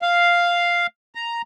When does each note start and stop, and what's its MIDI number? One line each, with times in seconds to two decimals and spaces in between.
0.02 0.87 77
1.15 1.42 82